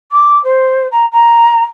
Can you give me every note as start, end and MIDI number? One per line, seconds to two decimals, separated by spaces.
0.12 0.42 86
0.44 0.88 72
0.92 1.06 82
1.12 1.62 82